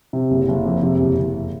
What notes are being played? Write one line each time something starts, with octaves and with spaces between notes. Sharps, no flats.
C3
F#1
F#1
F2
C3
F#1
F#1